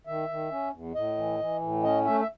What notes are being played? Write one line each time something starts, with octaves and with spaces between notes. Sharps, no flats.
D#3 E5
D#3
C#4
E2
A2 D#5
E3
E3
A2
C#4 D#5
A3 E5
E5